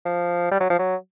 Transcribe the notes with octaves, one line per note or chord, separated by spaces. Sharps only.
F3
G3
F#3
F3
F#3